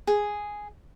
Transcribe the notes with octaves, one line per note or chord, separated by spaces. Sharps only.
G#4